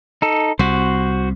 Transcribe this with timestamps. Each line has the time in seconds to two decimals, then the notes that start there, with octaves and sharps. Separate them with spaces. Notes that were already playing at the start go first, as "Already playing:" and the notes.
0.22 D#4 A4
0.59 C2 C3 F#4 C5